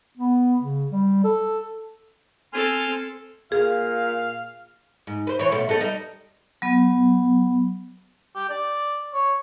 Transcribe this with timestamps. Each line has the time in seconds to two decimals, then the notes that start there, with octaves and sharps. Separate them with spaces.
0.17 B3
0.60 C#3
0.91 G3
1.24 A4
2.53 C4 A4 G#5 C6 F6
3.52 A#2 G#4 F5
5.07 G#2
5.27 B4 C5
5.39 E3 C#5
5.52 B2 F3 A3
5.69 B3 D#4 A4
5.81 G3 D#4
6.62 F#3 B3
8.36 G4
8.50 D5
9.14 C#5